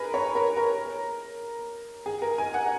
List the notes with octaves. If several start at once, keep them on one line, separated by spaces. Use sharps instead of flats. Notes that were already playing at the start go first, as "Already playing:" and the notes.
Already playing: G#4 A#4 B4
C#5
A#4
A#4
G#4
A#4
G#5
F#5